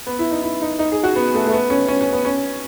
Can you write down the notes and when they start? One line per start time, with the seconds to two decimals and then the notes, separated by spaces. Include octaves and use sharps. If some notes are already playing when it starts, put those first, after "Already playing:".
0.07 B3
0.19 E4
0.31 D#4
0.43 E4
0.62 D#4
0.79 D#4
0.92 G#4
1.04 F#4
1.16 B3
1.34 A3
1.46 A3
1.52 B3
1.70 C#4
1.88 C#4
2.01 C#4
2.12 B3
2.25 C#4